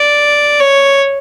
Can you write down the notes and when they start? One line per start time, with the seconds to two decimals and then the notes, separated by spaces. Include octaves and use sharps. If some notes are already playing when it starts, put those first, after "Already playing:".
Already playing: D5
0.60 C#5